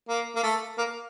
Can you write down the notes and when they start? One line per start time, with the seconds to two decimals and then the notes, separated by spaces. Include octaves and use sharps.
0.09 A#3
0.36 A#3
0.43 A3
0.78 A#3